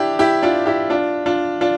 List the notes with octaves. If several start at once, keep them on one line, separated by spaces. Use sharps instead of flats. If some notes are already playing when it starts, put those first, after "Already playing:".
Already playing: D4 E4 G4
E4 G4
D4 F4
E4 G4
D4 F4
D4 F4
D4 F4